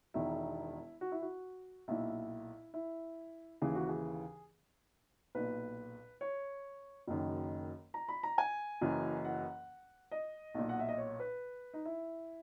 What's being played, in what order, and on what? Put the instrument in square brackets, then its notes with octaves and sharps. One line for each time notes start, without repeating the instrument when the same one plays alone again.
[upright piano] E1 E2 D#3 E4
F#4
E4
F#4
B1 A#2 E4
E4
D#2 C#3 E3 G#4
F#4
G#4
B1 A#2 B4
C#5
F#1 F#2 D#3
A#5
B5
A#5
G#5
F#1 F#2 E3
F#5
D#5
B1 A#2
F#5
E5
D#5
C#5
B4
D#4
E4